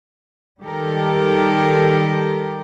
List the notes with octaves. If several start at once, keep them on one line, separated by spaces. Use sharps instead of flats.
D#3 G3 G4 A4 A#4